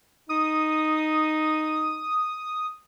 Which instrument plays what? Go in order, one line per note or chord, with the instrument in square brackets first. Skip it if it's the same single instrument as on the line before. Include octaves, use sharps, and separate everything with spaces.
[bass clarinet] D#4 [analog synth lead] D#6